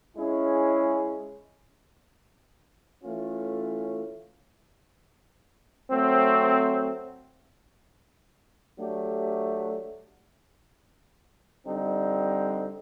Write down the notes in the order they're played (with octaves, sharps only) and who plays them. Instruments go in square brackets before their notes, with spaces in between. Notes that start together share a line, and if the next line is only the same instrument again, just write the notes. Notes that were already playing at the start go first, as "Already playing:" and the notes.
[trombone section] G#3 C#4 E4 G#4
E3 A3 C#4 F4
F#3 A3 C4
F#3 A3 D4 G4
D3 G3 C4 D#4